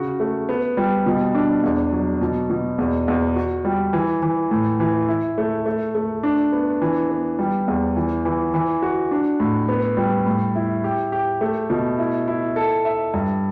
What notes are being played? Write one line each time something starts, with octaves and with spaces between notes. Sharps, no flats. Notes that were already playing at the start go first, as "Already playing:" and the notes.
Already playing: C#3 F#4
A3
B3
G3
B2
D4
E2
F#3
B2
B2
E2
E2
F#4
G3
E3
E3
A2
E3
E4
A3
A3
A3
D4
B3
E3
B3
G3
E2
E3
E3
E3
F#4
D4
A2
B3
G3
A2
E4
G4
G4
A3
B2
E4
E4
A4
E5
G2